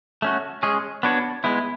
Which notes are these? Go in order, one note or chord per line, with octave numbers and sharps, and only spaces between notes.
A3 C#4 F#4
G#3 C#4 G#4
B3 D4 F#4 C#5
G#3 B3 E4